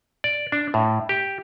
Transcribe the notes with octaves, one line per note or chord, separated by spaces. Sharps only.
D5
D4
A2
G4